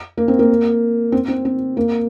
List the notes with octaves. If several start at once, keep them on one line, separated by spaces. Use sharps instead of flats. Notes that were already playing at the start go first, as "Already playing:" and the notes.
A#3
C4
A#3
C4
C4
C4
A#3